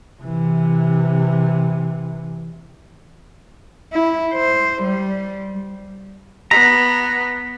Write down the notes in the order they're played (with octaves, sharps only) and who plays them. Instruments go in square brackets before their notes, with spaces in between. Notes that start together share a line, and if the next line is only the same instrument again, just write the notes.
[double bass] C3 E3
[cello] E4
C5
G3
[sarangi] B3 [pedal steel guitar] A#5 [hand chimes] B6